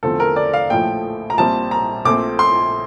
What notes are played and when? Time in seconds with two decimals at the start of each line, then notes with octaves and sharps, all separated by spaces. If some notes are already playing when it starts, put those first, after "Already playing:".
0.03 E2 D3 F3 A3 C4 A4
0.20 A#4
0.36 D5
0.53 F5
0.70 A#1 A2 F3 A3 G5
1.30 A#5
1.38 A#1 A#2 G3 C4 A5
1.71 A#5
2.05 A#1 A#2 A3 C4 D6
2.39 C6